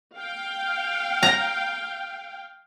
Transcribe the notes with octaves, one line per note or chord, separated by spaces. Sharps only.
F5 G5
A#5